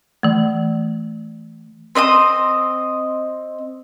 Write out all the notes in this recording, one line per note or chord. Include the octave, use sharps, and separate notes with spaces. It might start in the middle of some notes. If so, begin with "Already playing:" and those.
E3 A3
C4 D#5 C6 D#6